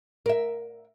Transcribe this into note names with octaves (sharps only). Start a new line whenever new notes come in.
A#4 E5